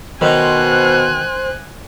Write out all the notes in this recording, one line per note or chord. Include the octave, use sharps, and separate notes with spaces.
B2 D#3 D#4 C5 G#5 F#6